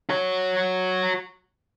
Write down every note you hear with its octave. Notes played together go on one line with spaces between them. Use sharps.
F#4 C#5